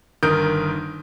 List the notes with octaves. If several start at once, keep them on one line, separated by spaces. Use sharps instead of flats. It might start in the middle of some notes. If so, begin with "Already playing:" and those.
G1 D#3 A#4 D#6 G6 D7